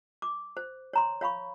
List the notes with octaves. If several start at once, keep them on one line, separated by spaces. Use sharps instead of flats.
D6
C5
C#5 A#5 C6
C#5 F5 B5 C#6